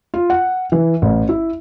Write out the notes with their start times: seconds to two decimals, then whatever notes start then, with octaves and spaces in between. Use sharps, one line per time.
0.14 F4
0.30 F#5
0.72 E3
1.02 A1
1.29 E4